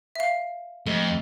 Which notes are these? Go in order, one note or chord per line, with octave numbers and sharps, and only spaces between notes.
E5 F5
F2 A3 D#5